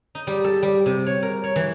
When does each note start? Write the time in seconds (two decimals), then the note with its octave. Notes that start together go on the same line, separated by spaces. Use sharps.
0.15 D#4
0.27 G3
0.44 A4
0.63 G3
0.86 C3
1.07 C#5
1.23 A#4
1.44 C#5
1.56 E3